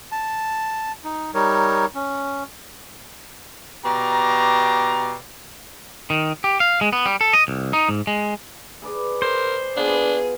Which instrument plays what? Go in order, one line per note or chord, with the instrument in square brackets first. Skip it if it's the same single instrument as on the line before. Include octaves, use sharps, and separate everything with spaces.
[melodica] A5
D#4
G3 D#4 A#4 C#5
C#4
[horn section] B2 G4 D5 A#5
[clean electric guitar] D#3
G4
F5
G#3
B3
G3
A4
D#5
C2
D#4
G#2
G#3
[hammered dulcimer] G#4 B4 D5
[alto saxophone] A#4 [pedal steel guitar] C5
[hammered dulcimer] B3 F4 [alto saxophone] D4 [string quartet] G#4